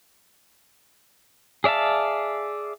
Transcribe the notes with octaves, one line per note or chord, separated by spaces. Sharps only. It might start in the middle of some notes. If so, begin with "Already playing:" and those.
G#4 D5 E5 F5 A5